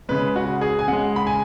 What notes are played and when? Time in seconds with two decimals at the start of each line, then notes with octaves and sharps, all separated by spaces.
0.09 C#3 G#3 B4
0.36 F#4
0.61 G#4
0.79 G#5
0.88 C#3 G#3 F#5
1.16 B5
1.27 G#5